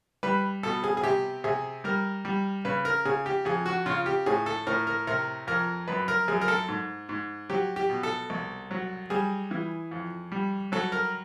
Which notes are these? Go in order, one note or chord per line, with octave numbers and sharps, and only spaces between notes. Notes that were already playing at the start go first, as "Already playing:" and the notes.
G3 B4
B2 A4
G#4
G#4
C3 G4
C3 G#4
G3 A#4
G3
C#3 B4
A#4
C#3 G#4
G4
F2 G#4
F#4
C#3 F4
G4
A2 G#4
A4
A2 A#4
A#4
C3 A#4
F2 A#4
F#2 B4
A#4
F#2 G#4
A#4
A4
G#2
G#2
F#3 G4
G4
B2
A4
C2
F#3
G3 G#4
E3
F2
G3
F#3 A4
A#4